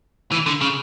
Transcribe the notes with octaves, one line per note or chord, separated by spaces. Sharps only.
E3
D3
C#3